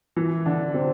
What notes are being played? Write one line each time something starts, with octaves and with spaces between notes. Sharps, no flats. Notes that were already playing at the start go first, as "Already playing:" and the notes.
E3 E4
D3 D4
C3 C4